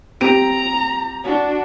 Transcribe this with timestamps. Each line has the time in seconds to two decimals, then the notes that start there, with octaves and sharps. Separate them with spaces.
0.21 C4 G4 A#5 D7
1.24 D4 F#4